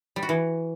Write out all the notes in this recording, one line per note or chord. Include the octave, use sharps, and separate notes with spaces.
G3
F#4
E3